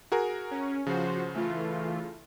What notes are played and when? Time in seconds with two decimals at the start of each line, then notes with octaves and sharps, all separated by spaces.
0.12 F#4 G#4 A#4
0.51 C#4
0.87 C#3 F3 F#4 C5
1.34 E3 A3 F4